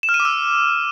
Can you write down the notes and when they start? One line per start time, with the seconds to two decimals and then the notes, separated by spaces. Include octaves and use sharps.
0.03 E7
0.09 F6
0.14 D#7
0.20 D6
0.25 E6